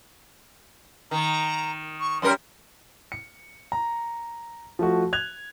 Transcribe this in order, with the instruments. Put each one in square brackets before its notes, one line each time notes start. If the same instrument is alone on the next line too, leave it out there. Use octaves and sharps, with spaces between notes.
[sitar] D#3 [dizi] A#5
[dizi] C#6
[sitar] F#2 G3 A#4 [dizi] C6
[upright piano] C#7
A#5
F3 A3 F#4
F#6 G#6 F7